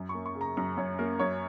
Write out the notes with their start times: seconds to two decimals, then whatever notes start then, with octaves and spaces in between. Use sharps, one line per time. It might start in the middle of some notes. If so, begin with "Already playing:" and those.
Already playing: F#2
0.09 C#6
0.15 A#3
0.26 C#6
0.35 C#3
0.41 A#5
0.57 F#2 A#5
0.77 F#2 C#5
0.99 A#3 A#4
1.20 F#2 C#5